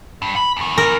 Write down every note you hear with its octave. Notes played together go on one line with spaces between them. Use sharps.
G2
B5
E2 D#3
A#4